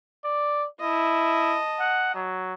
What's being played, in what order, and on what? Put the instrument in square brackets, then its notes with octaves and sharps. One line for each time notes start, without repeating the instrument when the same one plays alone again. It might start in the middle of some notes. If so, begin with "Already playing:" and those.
[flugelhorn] D5
[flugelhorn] E4 [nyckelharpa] D#5 A5
[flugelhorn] F#5
F#3